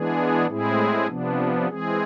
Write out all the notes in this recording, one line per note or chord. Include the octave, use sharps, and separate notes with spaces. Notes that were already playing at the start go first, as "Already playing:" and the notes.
Already playing: E3 G#3 B3 D4 G#4
A2 G#3 C4 E4 G#4
C3 F3 B3 D4
E3 G#3 C4 G#4